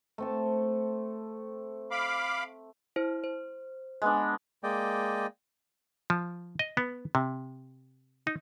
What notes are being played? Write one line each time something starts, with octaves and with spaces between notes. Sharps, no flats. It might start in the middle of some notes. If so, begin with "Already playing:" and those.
A3 C4 A5
F5 B5 D6
E4 C5
C5
G#3 B3 D4
G#3 A#3 D5 D#5 G5
F3
D#5
B3
C3
D#4